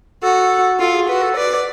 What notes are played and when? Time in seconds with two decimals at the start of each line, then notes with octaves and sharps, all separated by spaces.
0.23 F#4 A4
0.79 F4 A4
0.95 G#4
1.08 F#4 B4
1.22 A4
1.37 B4 D5